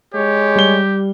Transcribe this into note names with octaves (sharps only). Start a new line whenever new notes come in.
G#3 G4 C#5
G3 G7